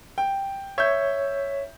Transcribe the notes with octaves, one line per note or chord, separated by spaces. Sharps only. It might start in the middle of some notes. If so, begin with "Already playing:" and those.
G5
C#5 E5 G6